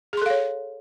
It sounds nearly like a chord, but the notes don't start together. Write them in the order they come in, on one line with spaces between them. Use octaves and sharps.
G#4 C6 A4 F5 C#5